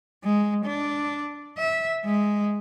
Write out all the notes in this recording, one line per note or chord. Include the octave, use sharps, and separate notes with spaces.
G#3
D4
E5
G#3